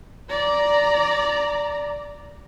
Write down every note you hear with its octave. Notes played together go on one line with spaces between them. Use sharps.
D5 A#5